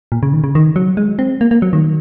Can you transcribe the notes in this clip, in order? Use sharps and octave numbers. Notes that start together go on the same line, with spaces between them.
A#2
C#3
D#3
C#3
D#3
F#3
G#3
C4
A#3
A#3
F#3
D#3